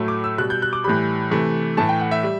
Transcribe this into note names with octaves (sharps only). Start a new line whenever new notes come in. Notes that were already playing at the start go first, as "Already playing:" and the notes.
Already playing: A2 F#3 A3
D6
E6
B2 G3 F#6
G6
F#6
D6
A2 E3 G3 B5
C3 E3 A3
A2 E3 A3 A5
G5
F#5
E5
G3